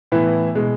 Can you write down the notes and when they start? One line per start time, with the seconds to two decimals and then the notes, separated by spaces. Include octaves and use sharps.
0.12 A2 E3 B3 E4
0.55 B2 G#3